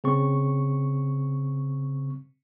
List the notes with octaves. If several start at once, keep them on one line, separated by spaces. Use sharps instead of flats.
C#3 C4 C#6